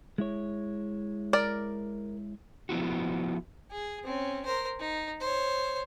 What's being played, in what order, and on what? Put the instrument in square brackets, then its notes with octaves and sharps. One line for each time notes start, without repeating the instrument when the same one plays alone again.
[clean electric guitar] G#3 E4 C#5
[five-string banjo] A#4 D5
[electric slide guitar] F3 B3 E4 F#4
[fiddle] G#4
C4 C#4
A#4 C5
D#4
C5 C#5